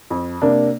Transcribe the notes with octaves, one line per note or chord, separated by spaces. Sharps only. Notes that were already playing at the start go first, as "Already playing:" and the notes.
F2
C3 A#3 D4